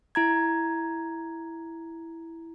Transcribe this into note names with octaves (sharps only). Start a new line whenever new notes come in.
E4 A#5 G#6